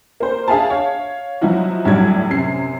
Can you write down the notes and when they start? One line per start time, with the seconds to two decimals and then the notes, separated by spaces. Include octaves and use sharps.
0.20 A#3 C5
0.48 D4 G#4 E5 F5 G#5 A5
0.70 C#5 F5
1.41 F3 F#3 D#4 E4 F#4
1.85 D2 A2 F#3 G3 D5 G#6
2.30 F#2 C3 C7